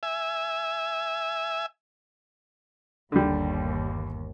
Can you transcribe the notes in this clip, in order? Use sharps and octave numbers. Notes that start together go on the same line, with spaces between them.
E5 G#5
G1 D#2 D3 G3